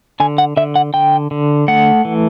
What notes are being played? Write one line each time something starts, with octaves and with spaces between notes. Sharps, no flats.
D3 G#5
F#5
D3 E5
F#5
D3 G5
D3
A3 F#5
E3